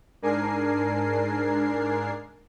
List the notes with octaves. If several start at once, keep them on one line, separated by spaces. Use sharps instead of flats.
G#2 D4 A#4 G#5 C7